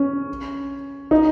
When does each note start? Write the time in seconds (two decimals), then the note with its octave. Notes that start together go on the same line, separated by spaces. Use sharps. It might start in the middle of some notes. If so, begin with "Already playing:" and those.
Already playing: C#4
1.11 D#4